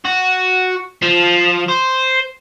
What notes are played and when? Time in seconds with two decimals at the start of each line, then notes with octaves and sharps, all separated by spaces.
0.05 F#4
1.02 F3
1.68 C5